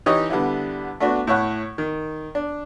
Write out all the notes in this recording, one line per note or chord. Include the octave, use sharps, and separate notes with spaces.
E3 D#4 G4 C#5 D#5
D3 G3 B3 E4
A3 B3 D4 F#4
A2 E4 C#5 F#5
D#3
D4